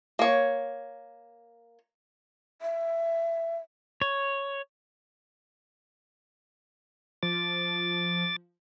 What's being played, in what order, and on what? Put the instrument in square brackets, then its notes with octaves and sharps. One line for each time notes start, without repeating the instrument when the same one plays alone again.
[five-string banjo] A#3 C#5
[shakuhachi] E5
[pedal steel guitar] C#5
[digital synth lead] F3 [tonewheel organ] D6 A6